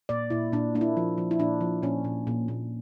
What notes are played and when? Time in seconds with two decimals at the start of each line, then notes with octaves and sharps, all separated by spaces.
0.09 A#2 D5
0.30 A#2 E4
0.52 A#2 D4
0.75 A#3 D4
0.81 E4
0.97 F3
1.18 F3
1.31 E4
1.39 A#2 D4
1.61 F3
1.82 A#2 C#4
2.04 A#2
2.27 A#2
2.48 A#2